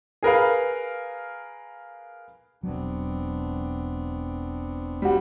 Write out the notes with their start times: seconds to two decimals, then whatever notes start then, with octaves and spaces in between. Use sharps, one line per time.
0.23 G#4 A#4 B4 F5
2.63 E1 F#3 B3 C4 D4
5.02 G3 F#4